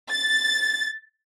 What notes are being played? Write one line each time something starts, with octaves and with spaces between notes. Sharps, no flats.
A6